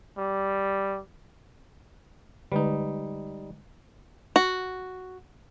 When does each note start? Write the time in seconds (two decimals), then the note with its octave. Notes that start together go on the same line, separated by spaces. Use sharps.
0.18 G3
2.52 D3 G3 G#3 D#4 B4
4.36 F#4